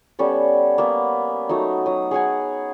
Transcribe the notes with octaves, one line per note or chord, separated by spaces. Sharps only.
G3 B3 C#4 A4
A#3 B3
F#3 A3 D#4
F#3 D#6
G#4 C#5 F#5 G#5